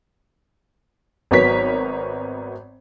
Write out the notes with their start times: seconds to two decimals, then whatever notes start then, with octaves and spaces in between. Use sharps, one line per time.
1.31 G#1 F#3 B3 A#4 C#5 B6